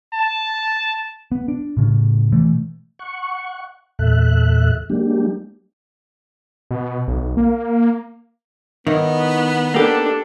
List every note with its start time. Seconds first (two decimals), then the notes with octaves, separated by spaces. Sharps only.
0.14 A5
1.32 B3
1.48 D4
1.77 A2 C#3
2.32 B2 E3 A3
2.99 F#5 C#6
3.99 E2 A#2 A4 E5 F#6
4.90 F#3 G#3 A#3 D4 G4
6.71 B2
7.08 B1
7.37 A#3
8.87 D#3 B3 D#4 E4 D#5
9.74 A#3 D4 G4 A4